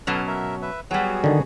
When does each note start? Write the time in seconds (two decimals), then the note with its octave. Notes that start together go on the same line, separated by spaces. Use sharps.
0.07 B2 F#3 C#4 A4 B4
0.27 A#4 E5
0.62 B4 E5
0.91 F#3 G3 B3 F#4 G#4
1.24 D3 D#3